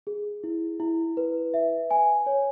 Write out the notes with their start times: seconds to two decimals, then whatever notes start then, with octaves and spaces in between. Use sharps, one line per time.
0.07 G#4
0.44 E4
0.80 E4
1.17 B4
1.54 E5
1.91 G#5
2.26 C#5